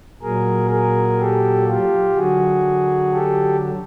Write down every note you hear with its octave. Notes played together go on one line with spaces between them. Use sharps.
A#2 F#3 G#4 A#4
G#4 A#4
G4 A4
F4 G4
D3 F#3 F#4 G#4
G4 A4